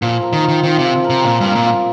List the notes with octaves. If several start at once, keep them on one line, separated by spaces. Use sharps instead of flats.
A#2 F3
A#4
D#3
F4
D#3
D#3 C4
C3
F3
A#4
C3
A#2 F4
G2 A#3
A#2
F4